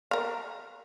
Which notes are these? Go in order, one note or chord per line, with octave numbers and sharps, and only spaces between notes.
A#4 F5